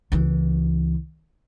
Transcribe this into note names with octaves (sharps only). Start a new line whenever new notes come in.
C#2 E3